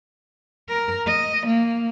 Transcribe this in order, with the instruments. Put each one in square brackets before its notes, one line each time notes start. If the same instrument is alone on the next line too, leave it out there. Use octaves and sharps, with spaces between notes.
[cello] A#4
D#5
A#3